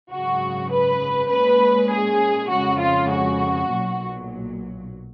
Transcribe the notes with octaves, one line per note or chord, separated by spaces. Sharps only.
G#1 F#2 C#3 F#4
B4
A#2 G#3 C#4 B4
G#4
F2 C#3 G#3 C#4 F#4
F4
F#4
B1 A#2 F#3